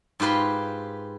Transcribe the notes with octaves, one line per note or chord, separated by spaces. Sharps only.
G#2 F4 G4 B4 C6